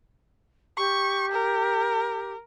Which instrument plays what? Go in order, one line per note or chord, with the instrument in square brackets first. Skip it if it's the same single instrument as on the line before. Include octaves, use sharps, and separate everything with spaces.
[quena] G4 [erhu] C#6
[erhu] A#4